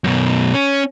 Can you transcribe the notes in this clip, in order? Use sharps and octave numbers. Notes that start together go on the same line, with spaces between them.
F#2 B2
C#4